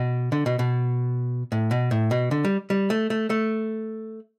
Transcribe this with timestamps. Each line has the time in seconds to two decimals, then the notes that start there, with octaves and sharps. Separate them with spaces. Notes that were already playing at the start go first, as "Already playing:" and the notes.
Already playing: B2
0.32 D3
0.46 B2
0.59 B2
1.52 A2
1.71 B2
1.91 A2
2.11 B2
2.31 D3
2.45 G3
2.70 G3
2.90 A3
3.10 A3
3.30 A3